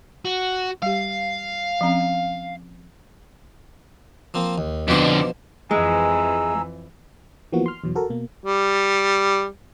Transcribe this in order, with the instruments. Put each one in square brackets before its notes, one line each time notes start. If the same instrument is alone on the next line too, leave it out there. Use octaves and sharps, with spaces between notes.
[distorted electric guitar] F#4
[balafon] G3 G4 [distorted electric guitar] F5
[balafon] F3 C4 C#4
[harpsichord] F3 A#3 C4
D#2
[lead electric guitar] F2 D3 [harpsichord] B2 F3 C5
[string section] F2 E3 [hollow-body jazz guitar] G#3 [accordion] G#5 A#5 E6
[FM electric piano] E3 F3 A#3 B3 F#4
C6 F6
E2 B2 F#3
F#4 A4 A#4
B2 A#3
[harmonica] G3